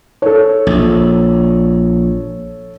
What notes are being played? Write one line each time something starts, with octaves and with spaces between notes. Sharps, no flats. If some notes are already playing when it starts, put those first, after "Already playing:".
A4 C#5
A#1